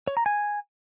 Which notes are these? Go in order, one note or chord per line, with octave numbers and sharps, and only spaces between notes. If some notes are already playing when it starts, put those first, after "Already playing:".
C#5
A#5
G#5